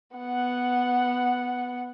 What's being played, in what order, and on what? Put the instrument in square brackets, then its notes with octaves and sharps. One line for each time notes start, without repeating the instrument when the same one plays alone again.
[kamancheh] B3 F#5